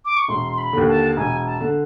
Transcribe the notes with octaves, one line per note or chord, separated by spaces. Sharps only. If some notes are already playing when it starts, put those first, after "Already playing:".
D6
C#6
E1 C6
C6
B5
D#2 D3
A5
E1 G#5
A5
D3